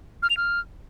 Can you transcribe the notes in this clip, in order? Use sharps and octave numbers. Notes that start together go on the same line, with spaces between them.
F6
F7
F6